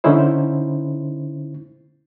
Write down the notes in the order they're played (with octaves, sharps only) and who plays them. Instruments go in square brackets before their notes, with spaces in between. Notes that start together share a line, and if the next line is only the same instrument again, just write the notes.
[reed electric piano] D3 C#4 D#4 E4 C5